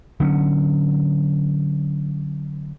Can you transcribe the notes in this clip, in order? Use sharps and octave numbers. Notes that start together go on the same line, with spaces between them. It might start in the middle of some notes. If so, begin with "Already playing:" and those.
D3 F#3 B3 C#4